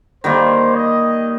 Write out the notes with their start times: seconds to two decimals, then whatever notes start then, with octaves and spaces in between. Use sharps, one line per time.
0.24 D#3 G3 A#3 C5
0.75 D#5